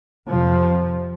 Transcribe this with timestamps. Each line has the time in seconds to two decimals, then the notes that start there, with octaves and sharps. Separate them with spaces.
0.29 F2 C3 F3